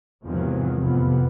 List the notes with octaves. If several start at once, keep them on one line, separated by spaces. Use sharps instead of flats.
E2 G#2 C3 D#3 F3 F#3
A1 F2 C3 F3 B3